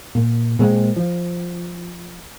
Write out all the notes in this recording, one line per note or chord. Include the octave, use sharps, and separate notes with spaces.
A#2
A#2 G#3 C4
F3